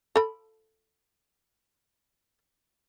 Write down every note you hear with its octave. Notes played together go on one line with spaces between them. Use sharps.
A4 B5